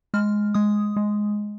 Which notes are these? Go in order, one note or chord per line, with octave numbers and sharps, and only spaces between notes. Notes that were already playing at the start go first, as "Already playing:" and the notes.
G#3 F6
G#3 D#6
G#3